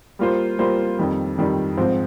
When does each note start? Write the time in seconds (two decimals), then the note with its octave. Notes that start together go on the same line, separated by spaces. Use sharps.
0.19 G3 A#3 F4 C5
0.59 G3 A#3 F4 C5
0.99 F2 D#3 G3
1.38 F2 D#3 G3
1.77 G#2 F3 C4